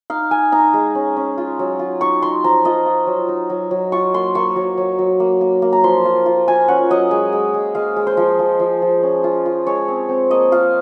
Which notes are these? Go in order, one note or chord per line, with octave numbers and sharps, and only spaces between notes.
D#4 F5
D#4 G#5
D#4 A#5
G#3
C#4
C#4
F4
F#3
F4
D#4 C#6
D#4 C6
F3 A#5
F4 D#5
F4
F#3
D#4
F#3
F#3
F4 C#6
A#3 C6
A#3 C#6
F#3
F#3
F#3
A#3
A#3
A#3
A#5
F3 C6
F4
F4
F4 G#5
C#4 F#5
F#3 D#5
G#3
G#3
G#3
G#3 F5
G#3
C5
F3
F3
F3
F3
C#4
F4
F4
G#3 C#5
C4
C4
A#3 D#5
F4 F5